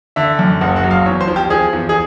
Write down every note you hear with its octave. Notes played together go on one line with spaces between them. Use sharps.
D3 E5
F#2
F#1 F#5
F#5
F#3
F5
E2 C#5
C5
F3
G4
F3 G#4
E2
G#4